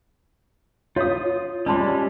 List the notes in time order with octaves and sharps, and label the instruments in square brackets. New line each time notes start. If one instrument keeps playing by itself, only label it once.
[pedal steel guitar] F4 D#6 [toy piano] C#5 F5
[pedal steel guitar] G3 G#3 C#4 [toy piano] D5 A5 C6